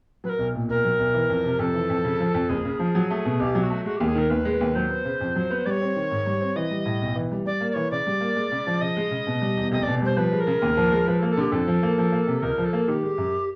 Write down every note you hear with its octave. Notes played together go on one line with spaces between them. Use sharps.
F#3 B4
A#4
B1
A#2
B1 A#4
F#3
B1
E3
F2
C3
F2 A4
E3
F2
C#3
F3
F2
F#1 G#4
C#3
F3
F#3
A3
B2
B1 G4
F#3
F#4
A3
G#3 F#4
D#2 G4
G#4
D#3 A#4
D#2 B4
G#3
B4
D#2
F#3 C5
B3
C#3
F2
F#3
B3
G3 C#5 D5
C4
D#3
G#2
G3
C4
E3 D#5
G3
A2
B1
E3
G3
G3 D5
A#3
D5
E3 C#5
C#3 D5
G3
A#3
G#3
C#3
F3
C#3 D#5
G#3
C#3
B2
G3
E2
F1 D#5
B2 D5
G3 C5
F3 B4
G#3
A#4
C#3
D#2
F3
G#3
F3 B4
A4
A#3
A4
D3 G4
F2 A4
F3
A#3
F3
A#3
C3
C#2 A#4
F3
A4
A#3
D#3 G4
G#3
F#2